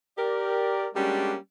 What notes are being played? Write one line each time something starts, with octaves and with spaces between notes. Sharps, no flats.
G4 A#4 D5
G3 G#3 A#3 C#4 D4 F#4